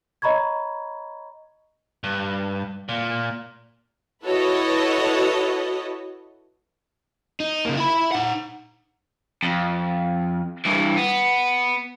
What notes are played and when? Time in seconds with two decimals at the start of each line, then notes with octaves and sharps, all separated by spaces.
0.22 C#5 D#5 A#5 B5 C#6 G#6
2.04 G2
2.89 A#2
4.23 E4 F#4 A4 B4 C#5 D#5
7.40 D#4
7.65 C#3 A#3
7.77 E4 B5
8.12 D#4 F#5
9.43 F2
10.66 G2 E3
10.97 B3